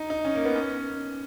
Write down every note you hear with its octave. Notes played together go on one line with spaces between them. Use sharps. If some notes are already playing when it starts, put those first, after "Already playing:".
Already playing: D#4
D#4
C#4
A#3
B3
C#4